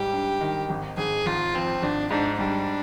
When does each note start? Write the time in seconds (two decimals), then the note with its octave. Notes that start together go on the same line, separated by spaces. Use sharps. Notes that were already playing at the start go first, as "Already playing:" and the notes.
Already playing: G#2 G3 G4
0.13 D4
0.41 D#3
0.70 G#1
0.97 G#1 G#4
1.26 G#1 F4
1.54 F3 C4
1.82 G#1 D4
2.11 G#2 D4
2.39 G3 D4